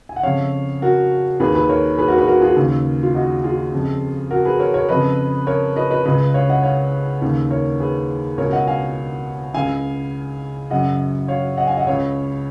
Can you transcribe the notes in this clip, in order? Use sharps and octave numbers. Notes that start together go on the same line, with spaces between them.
G#5
F#5
F2 C#3 C#5 F5
F#4 A#4
D#2 D#3 G#4 B4
G#4 B4
A#4 C#5
G#4 B4
F#4 A#4
G#4 B4
F#4 A#4
F4 G#4
D#2 C#3
F4
D#4 F#4
F4 G#4
F2 C#3
F#4 A#4
G#4 B4
A#4 C#5
A#4 C#5
F2 C#3 B4 D#5
A#4 C#5
B4 D#5
B4 D#5
C#2 C#3 B4 D#5
C#5 F5
D#5 F#5
C#5 F5
D#2 C#3
A#4 C#5
G#4 B4
C#2 B2 A#4 C#5
D#5 F#5
F5 G#5
C#2 C#3 F5 G#5
F#2 C#3 D#5 F#5
C#5 F5
D#5 F#5
F5 G#5
D#5 F#5
C#2 C#3 C#5 F5